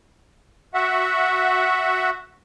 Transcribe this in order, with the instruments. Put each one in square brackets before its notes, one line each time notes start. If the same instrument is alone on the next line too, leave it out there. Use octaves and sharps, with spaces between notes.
[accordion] F#4 E5 F#5